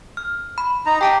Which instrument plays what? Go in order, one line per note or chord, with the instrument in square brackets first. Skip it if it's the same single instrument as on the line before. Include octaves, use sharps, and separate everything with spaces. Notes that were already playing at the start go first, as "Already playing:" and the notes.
[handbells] F6
B5
[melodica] D#4 A#5
[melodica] G4 [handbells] G5 A5 A#5